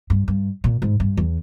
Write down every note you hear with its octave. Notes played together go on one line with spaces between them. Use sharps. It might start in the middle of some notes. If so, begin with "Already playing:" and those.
G2
G2
A#2
G#2
G2
E2